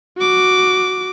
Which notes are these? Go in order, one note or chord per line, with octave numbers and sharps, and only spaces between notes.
F#4 D6